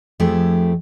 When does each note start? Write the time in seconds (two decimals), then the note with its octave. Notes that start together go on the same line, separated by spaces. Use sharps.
0.20 F2 F3 A3 G4 G#4